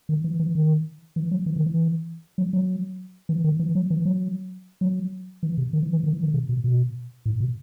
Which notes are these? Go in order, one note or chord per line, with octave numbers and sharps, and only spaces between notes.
D#3
E3
E3
D#3
E3
F#3
E3
D#3
E3
F#3
F#3
E3
D#3
E3
F#3
E3
F#3
F#3
E3
C3
D#3
E3
E3
D#3
E3
D#3
C3
B2
B2
A2
B2